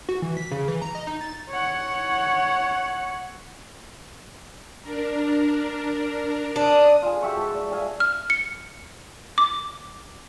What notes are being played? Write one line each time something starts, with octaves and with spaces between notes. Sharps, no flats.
F#4
E3
B6
C#3
E3
A#5
D#5
D#4
A6
C#5 F#5
D4 A#4
D4 D#6
F4 G#4
F#4 G4 E5 C#6
G#2 A5
D5
G#4 E5 F5 G#5
F6
C#7
D6